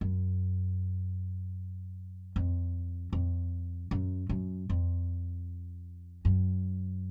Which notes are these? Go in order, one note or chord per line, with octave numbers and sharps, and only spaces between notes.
F#2
F2
F2
F#2
F#2
F2
F#2